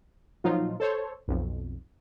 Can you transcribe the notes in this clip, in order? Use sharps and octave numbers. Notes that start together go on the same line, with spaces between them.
A#2 F3 F#3 D#4 F4
A4 C5 C#5
B1 F2